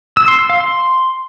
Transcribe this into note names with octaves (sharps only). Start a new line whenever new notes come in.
E6
C6
E6
F5
C6